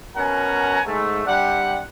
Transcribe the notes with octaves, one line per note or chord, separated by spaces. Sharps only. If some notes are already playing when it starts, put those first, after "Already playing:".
B2 C#4 A#4 F#5 G#5 A#5
G#2 A3
C3 G3 D4 G4 F#5